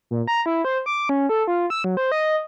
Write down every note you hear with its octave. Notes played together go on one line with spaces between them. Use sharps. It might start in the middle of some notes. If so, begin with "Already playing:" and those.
A#2
A#5
E4
C5
D6
C#4
A4
F4
E6
F#3
C5
D#5